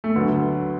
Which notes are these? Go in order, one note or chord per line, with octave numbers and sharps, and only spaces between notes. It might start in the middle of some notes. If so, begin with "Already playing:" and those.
A3
D2 D3 F#3 B3